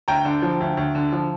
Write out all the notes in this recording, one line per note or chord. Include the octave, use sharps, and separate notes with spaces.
D2 G5 A#5
D3
F3
D2
D2
D3
F3